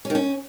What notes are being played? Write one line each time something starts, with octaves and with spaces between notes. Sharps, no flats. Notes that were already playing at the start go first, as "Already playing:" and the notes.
C#4
D#3
C#4